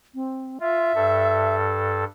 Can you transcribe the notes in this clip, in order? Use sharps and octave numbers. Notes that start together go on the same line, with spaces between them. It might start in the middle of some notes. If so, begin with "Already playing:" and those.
C4
F4 E5
G2 A4